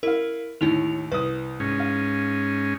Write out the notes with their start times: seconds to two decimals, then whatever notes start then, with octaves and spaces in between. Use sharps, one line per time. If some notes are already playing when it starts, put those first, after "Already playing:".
0.03 E4 A#4 F5
0.61 D#2 A2 D#4 E4 F7
1.12 C2 B4 D#6
1.60 G#2 C#4
1.80 F5